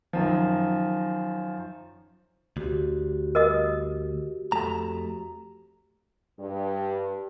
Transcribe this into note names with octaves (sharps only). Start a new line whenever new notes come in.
F#2 D#3 F3
D2 F#4 G4
A#4 D#5 D#6
F2 A3 A#5
G2